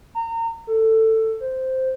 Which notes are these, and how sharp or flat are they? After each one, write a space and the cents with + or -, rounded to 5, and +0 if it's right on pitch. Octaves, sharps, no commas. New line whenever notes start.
A#5 -30
A4 +15
C5 -5